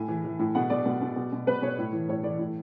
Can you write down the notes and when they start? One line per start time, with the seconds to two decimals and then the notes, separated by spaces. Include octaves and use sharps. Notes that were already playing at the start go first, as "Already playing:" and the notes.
Already playing: A2 G#5
0.08 E3
0.25 E3
0.39 A2
0.55 B2 F#5
0.70 B2 D5
0.86 B2
1.02 B2
1.16 B2
1.32 B2
1.47 B2 B4
1.62 B2 C#5
1.78 A2
1.93 E3
2.08 A2 C#5
2.24 E3 D5
2.39 A2